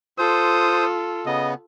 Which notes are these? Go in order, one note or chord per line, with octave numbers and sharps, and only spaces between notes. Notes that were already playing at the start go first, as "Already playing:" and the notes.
F4 A4 C5 D#6
C#3 B3 D#5